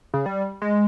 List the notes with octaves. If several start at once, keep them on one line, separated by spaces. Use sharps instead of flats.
C#3
G3
G#3